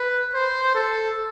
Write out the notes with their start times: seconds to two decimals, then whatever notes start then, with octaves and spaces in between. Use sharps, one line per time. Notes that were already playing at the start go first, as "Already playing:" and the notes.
Already playing: B4
0.34 C5
0.75 A4